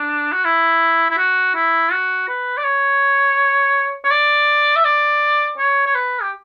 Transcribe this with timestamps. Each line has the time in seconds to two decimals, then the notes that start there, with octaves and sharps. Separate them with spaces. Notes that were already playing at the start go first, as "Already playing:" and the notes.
Already playing: D4
0.32 F#4
0.45 E4
1.10 E4
1.18 F#4
1.55 E4
1.91 F#4
2.28 B4
2.57 D5
2.64 C#5
4.04 C#5
4.11 D5
4.76 E5
4.85 D5
5.58 C#5
5.87 C#5
5.95 B4
6.22 G4